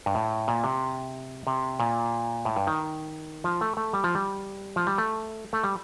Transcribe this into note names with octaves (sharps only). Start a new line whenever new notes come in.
G2
A2
A#2
C3
C3
A#2
A2
G2
D#3
F3
A3
A3
G3
F3
G3
F3
G3
A3
A3
G3